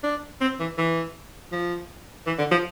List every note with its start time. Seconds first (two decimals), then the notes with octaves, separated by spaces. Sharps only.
0.04 D4
0.41 C4
0.60 E3
0.78 E3
1.52 F3
2.27 E3
2.39 D3
2.51 F3